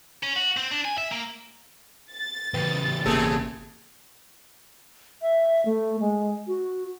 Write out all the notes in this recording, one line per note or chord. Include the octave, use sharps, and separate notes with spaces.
C#4
F#4
C4
D4
G#5
E5
A#3
A6
E2 C#3 B4 G5 B5
G1 B2 A#3 B3 G#4 A4
E5
A3
G#3
F#4